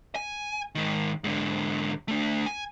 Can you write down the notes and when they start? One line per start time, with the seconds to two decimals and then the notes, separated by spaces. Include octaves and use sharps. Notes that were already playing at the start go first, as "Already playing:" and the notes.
0.15 G#5
0.75 G#2 D#3
1.24 G#2 D3
2.08 A3 D4
2.46 G#5